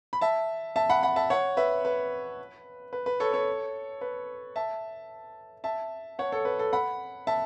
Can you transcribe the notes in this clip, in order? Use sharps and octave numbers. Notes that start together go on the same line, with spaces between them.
B5
E5 A5
E5 A5
F#5 B5
F#5 B5
E5 A5
C#5 F#5
B4 E5
B4
B4
B4
A4 C#5
A4 C#5
B4
E5 A5
E5 A5
C#5 F#5
A4 C#5
B4
A4
F#5 B5
E5 A5